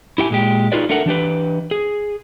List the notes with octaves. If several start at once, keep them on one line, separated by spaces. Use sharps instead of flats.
E4 G4 F#5 G#5
A#2 G#3 G4
D#4 F4 F#4 G#4 B4 D5
A3 D4 A4 A#4 F#5
E3 D4 G4 B4
G#4